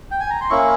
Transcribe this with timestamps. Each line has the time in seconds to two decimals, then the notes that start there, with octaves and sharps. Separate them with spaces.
0.11 G5
0.20 G#5
0.30 A#5
0.41 C6
0.50 A#3 C#4 E4 C#6